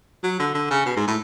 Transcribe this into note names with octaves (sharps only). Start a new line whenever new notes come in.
F#3
D3
D3
C#3
B2
G#2
A2